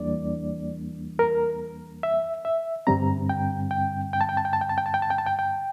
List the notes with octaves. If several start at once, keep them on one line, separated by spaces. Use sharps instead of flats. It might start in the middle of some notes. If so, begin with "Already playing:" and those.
Already playing: E2 E3 G3 A#3 D4 D5
A#4
E5
E5
G2 D3 G3 C4 A#5
G5
G5
G5
A5
G5
A5
G5
A5
G5
A5
G5
A5
G5
A5
G5
A5
G5
G5